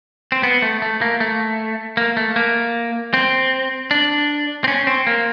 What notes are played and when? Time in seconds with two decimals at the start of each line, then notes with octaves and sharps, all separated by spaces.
0.32 C4
0.43 B3
0.62 A3
0.82 A3
1.01 A#3
1.20 A3
1.97 A#3
2.17 A3
2.36 A#3
3.14 C4
3.91 D4
4.64 C4
4.68 C#4
4.87 C4
5.07 A#3